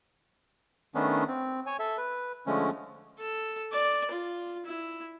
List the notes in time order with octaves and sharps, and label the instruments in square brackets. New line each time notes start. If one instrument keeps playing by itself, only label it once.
[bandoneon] D#3 A3 B3 C#4 D4
C4
C#5 G#5
A4 E5
B4
D3 F3 G#3 A3 C#4
[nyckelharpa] A4
D5
F4
E4